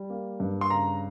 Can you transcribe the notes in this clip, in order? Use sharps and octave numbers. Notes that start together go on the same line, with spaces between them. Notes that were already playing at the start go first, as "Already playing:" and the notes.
Already playing: G3
A#3
G2
C6
C#3 A#5